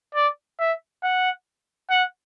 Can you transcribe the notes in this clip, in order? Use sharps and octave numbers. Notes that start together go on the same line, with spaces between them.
D5
E5
F#5
F#5